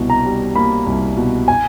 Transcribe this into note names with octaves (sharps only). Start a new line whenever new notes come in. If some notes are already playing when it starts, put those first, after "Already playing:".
Already playing: C2 B2
A#5
G3
A#3 B5
C2
B2
G#5